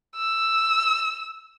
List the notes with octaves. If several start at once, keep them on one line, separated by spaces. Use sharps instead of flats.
E6